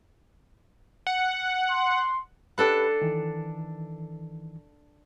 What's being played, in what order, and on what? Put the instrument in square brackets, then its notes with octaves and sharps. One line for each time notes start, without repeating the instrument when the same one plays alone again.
[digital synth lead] F#5
[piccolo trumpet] C6
[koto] D4 A4 F#5 [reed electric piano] G4 B4 B5
[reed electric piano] D#3 E3